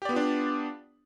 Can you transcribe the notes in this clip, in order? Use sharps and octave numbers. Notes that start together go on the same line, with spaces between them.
B3 D4 F4 G4 D5